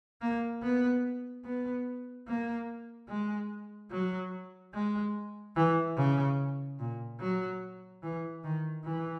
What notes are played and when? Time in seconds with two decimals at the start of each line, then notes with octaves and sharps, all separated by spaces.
0.21 A#3
0.63 B3
1.45 B3
2.28 A#3
3.09 G#3
3.91 F#3
4.74 G#3
5.56 E3
5.97 C#3
6.79 A#2
7.20 F#3
8.03 E3
8.44 D#3
8.85 E3